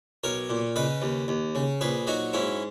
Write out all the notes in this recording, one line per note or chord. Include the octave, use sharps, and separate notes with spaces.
B1 A#4 C#5
A#2
C#3 B4 D#5
D#2
D#2
C#3
A#1 G#4 B4
F#3 D#4 F#4
G#2 C#4 E4